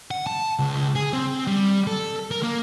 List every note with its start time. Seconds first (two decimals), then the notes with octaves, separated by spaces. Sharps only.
0.11 F#5
0.27 A5
0.59 C#2
0.96 G#4
1.13 C4
1.47 G3
1.87 A4
2.31 A#4
2.43 A#3